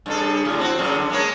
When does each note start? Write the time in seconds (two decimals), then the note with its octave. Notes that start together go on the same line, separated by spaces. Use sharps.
0.06 G2 C#3 A4
0.45 A2 D3
0.59 C4 E4 F#4
0.79 F#2 A#2 C#3
0.95 D3
1.10 G#3 A#3 C#5